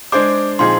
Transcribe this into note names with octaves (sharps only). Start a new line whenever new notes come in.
G#3 D4 G#4 C5 D6
A#2 F3 C4 D#4 G#4 C6